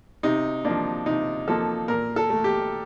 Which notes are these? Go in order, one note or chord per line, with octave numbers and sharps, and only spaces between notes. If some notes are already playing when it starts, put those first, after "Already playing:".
C3 D#4
F3 A#3 D4
C3 D#4
F3 A#3 A4
A#2 A#4
A4
A3
G4